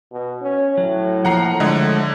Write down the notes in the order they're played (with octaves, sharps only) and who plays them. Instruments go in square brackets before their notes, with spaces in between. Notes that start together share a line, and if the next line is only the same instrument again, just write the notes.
[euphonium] B2
C#4
[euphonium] A2 [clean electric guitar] F#3
[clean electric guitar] F3 A#3 [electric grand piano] F#5 A#5 C7
[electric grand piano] D3 D#5 [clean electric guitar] F3 G#3 A3